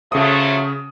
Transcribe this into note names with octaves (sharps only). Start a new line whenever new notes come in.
C#3 F3 F#3 A3 D#6